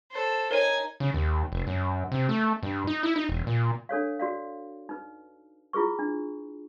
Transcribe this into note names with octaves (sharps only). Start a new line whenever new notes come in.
A4 C5
D#4 A#4 C#5 G#5 D#7
C#3
D#2
F1
F#2
C3
A3
G2
D#4
E4
D#4
E1
A#2
D4 A4 C#5 F5
F#4 D5 F5
D#4 B4
E4 F4 G#4 B4 C#6
D4